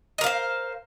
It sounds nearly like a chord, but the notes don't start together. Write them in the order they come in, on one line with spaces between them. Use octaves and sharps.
D#5 A#4 F5 C5